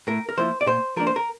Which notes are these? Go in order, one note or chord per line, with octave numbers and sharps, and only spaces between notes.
A2 A#4
A#4
F3 A#3 E4 C5
D5
A#2 C5
F3 A#3 D4 A#4
C5
A#4